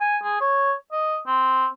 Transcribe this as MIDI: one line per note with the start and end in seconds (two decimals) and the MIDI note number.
0.01 0.17 80
0.22 0.37 68
0.41 0.74 73
0.92 1.18 75
1.27 1.67 60